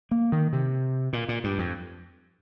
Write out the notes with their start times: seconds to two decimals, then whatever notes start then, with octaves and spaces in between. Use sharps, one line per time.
0.11 A#3
0.32 D#3
0.53 C3
1.13 A#2
1.29 A#2
1.44 G2
1.59 F2